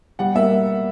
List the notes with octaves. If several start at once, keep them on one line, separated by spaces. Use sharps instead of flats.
G3 F#5
A#3 E5